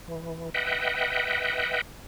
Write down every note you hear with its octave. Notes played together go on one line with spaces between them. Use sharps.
E3
B4 D#5 E5 F#5 G5